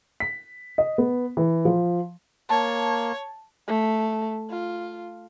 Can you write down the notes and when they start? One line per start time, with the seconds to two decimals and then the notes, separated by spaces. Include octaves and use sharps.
0.20 B6
0.78 D#5
0.98 B3
1.37 E3
1.65 F3
2.50 A#3 C#5 A5
3.68 A3
4.50 F4